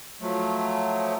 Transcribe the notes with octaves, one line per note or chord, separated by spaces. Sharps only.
F3 F#3 A3